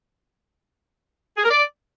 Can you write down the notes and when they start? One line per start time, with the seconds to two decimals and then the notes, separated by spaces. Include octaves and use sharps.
1.37 G#4
1.44 A#4
1.50 D5